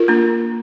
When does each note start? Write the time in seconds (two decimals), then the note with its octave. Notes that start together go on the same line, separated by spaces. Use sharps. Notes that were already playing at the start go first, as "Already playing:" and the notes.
Already playing: F4 A#4
0.08 A#3 D4